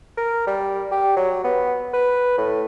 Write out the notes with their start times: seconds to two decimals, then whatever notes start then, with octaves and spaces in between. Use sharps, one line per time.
0.17 A#4
0.47 G3
0.92 G4
1.16 F#3
1.44 B3
1.94 B4
2.37 A2